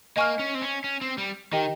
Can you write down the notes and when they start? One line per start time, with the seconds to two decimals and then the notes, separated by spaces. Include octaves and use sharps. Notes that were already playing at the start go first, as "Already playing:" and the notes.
0.16 A#3 D#5 G#5 C#6 F6
0.39 C#4
0.55 C4
0.62 C#4
0.84 C#4
1.01 C4
1.18 G3
1.53 D#3 G4 A#4 D#5 G5